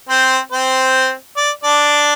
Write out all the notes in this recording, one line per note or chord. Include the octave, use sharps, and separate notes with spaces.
C4 C5
C4 C5
D5
D4 D5